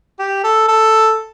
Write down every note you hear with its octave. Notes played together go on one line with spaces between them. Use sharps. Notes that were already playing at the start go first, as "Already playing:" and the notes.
G4
A4
A4